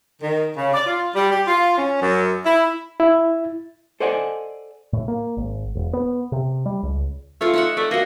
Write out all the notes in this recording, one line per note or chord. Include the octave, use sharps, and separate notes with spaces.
D#3
C#3
D5
F4
G3
G4
F4
C#4
F#2
E4
E4
A4 C5 D5 D#5 F#5 G#5
A2
A#3
G#1
E1
B3
C3
G3
C#2
A3 F4 C#5
D#4 E5 F#5
A3 D5
A#3 F#4 D#5